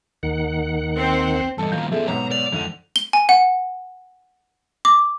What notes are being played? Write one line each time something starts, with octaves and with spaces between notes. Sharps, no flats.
D#2 D#3 F#5
C4 C5
E2 G2 A4 D#5
D#2 F3 F5 A#5 G6
F3 B3 G#4 A4 E5
B1 G#2 B3 C#5 A#5
D5 F7
F2 G#2 D3 D#7
G7
G#5
F#5
D6